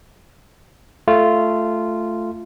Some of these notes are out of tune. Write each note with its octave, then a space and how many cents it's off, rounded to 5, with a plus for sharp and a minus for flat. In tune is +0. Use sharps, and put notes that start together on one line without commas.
A3 +0 F4 -10